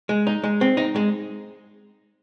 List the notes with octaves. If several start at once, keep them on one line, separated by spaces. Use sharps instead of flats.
G#3
D#4
G#3
C4
D#4
G#3